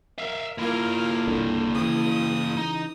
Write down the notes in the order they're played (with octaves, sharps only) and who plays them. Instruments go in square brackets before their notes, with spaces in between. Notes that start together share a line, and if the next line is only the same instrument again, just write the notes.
[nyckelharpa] A#4 [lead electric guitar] E5 F5
[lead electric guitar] A#3 E4 [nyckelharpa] F4 A#4
[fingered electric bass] C2 D3
[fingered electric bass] C#3 E3 [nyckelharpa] D#6
[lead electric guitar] D#4